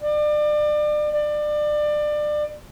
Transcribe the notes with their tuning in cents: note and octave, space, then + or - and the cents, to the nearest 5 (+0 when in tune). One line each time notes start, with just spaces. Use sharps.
D5 +30
D5 +25